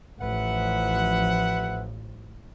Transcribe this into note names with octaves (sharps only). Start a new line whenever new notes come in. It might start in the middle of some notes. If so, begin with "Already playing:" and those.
A1 F3 B4 E5 F#5